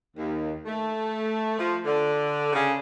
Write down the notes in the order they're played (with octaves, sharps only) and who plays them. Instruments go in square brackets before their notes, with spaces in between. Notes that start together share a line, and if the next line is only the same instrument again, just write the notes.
[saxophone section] D#2
A3
F3
D3
C#3